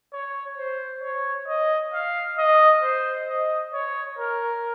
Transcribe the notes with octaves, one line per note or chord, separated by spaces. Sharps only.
C#5
C5
C#5
D#5
F5
D#5
C5
D#5
C#5
A#4